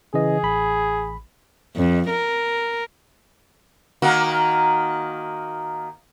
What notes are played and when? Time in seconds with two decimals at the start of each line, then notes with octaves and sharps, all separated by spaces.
0.14 C#3 E3 G#4 D#5
0.43 A1 B5
1.76 F2
2.10 A#4
4.02 D#3 A#3 F#4